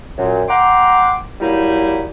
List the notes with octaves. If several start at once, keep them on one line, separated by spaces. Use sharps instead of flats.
F#2 A#2
F#5 G5 A#5 C6 D6
F#3 G3 A#3 D#4 E4